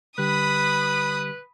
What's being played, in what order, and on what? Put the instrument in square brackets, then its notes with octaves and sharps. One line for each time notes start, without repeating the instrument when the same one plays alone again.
[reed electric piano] D3 G3 G4 [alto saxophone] B4 [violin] B5 D#6